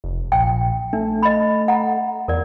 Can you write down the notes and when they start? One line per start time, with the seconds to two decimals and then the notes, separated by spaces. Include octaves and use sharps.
0.04 F1
0.32 A#1 G5
0.93 A3 D4
1.23 D#5 B5
1.68 F#5 A#5
2.28 E2 A#4 D5